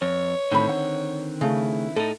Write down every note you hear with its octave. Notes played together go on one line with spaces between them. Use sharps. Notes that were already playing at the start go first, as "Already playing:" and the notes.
F2 C#5
A2 D3 D#3 C4 B5
F#5
C#3 A3 E4
A2 D#4 A4